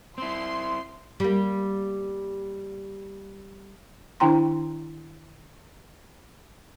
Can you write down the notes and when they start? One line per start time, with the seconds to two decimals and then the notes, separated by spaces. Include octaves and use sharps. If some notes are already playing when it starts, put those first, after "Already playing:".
0.18 C4 E4 C6
1.20 G3 A#3
4.20 D#3 D4 E4 G5 A#5 C6